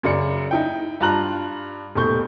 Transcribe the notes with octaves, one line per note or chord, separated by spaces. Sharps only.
F#2 C#3 D5 C#7
D#4 E4 G5
G2 F4 A5 A#5 F#6 F#7
D#1 B2 A3 C#6 G6